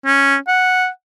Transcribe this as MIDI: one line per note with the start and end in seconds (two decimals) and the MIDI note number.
0.05 0.36 61
0.48 0.88 78